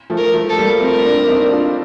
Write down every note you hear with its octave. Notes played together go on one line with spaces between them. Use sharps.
F3 A3
A#4
F3 A3
A4
G3 A#3
A3 C4 A#4
A#3 D4
C4 D#4
D4 F4